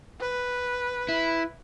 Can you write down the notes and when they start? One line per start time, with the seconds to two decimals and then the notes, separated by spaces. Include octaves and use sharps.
0.20 B4
1.09 E4